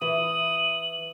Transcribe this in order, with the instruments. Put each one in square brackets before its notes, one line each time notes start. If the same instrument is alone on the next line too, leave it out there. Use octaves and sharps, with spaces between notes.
[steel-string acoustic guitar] E3 [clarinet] D#6 [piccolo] F#7